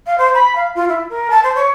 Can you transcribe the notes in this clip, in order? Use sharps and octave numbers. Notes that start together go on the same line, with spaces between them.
F5
C5
B5
F5
F4
E4
A#4
A5
C5
C#5